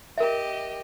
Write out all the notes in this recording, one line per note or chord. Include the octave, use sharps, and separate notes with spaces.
G4 A#4 D#5 E5